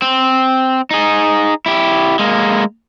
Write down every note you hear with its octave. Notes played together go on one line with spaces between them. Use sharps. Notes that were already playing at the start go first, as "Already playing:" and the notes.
C4
D#4 G#4
E4 G4
G#3 A#3